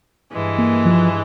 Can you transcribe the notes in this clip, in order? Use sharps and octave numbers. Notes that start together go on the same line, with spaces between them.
G2 E3 G#3
A#3
F3